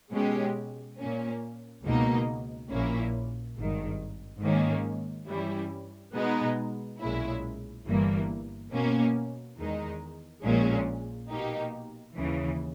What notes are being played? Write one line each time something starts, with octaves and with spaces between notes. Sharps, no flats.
B2 G#3 C#4 G4
A#2 A#3 C#4
C#2 B2 A#3 D#4
A#1 A#2 A#3 C#4 E4
G#1 G2 D#3
G#2 D#3 A#3 C#4
G2 E3 G3 C#4 E4
B2 G#3 B3 D#4
B1 A#2 G#3 C#4 E4
G1 G2 E3 A#3
B2 A#3 C#4
E2 D#3 G#3 D#4
A#1 A#2 G#3 C#4
B2 A#3 D#4 G4
D#2 C#3 E3